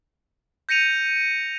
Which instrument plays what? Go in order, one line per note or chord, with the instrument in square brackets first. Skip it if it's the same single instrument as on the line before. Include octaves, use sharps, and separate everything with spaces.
[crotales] G6 A#6 C#7 D#7 F7